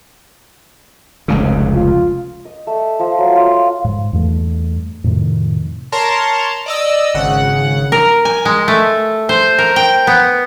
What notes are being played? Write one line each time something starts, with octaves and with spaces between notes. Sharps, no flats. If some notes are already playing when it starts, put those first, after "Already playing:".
F1 C#2 C#3
F4
D#5
A3
F3
F#3
F4
G#2
E2 G2 A3
F2 A2 C3 D#3
A#4 C#5 A5 A#5 C6
D5 D#5 E6
G#1 C#3 F#5
A#4
G#5
G#3
A3
C5
A#4
G5
B3